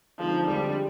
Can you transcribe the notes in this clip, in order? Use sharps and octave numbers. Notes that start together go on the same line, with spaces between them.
D3 F3 G#3 C4 D#4
F2 D3 G3 G#3 C4